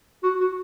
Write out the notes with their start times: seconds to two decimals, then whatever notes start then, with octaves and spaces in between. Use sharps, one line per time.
0.23 F#4
0.40 F#4